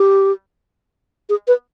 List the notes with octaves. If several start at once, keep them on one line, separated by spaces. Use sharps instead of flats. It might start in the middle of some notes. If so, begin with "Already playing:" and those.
Already playing: G4
G#4
B4